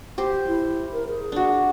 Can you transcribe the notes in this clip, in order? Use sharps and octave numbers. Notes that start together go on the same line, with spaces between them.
G4 C5
E4
A#4
G#4
D4 F#4